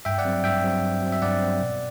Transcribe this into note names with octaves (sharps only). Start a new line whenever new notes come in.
G2 E5 G5
D5 F#5
F#3 C4
G2 E5 G5
F#3 C4
G2
F#3 C4
E5
G2 D5 F#5
F#3 C4
B2